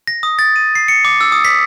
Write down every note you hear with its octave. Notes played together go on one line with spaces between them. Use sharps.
A#6
D#6
A6
D#7
C7
C#7
D6
E6
D#6
B6